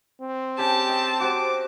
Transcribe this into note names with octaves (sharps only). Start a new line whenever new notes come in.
C4
C#4 G4 G#4 G#5 A5
D#5
F#4 G4 C5 D6